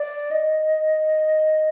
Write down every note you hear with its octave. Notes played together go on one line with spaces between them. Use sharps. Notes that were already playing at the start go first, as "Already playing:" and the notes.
Already playing: D5
D#5